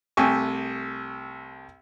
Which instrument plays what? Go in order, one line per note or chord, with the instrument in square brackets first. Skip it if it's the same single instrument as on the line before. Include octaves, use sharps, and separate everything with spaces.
[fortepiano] C2 A3 G4 G#5 C#6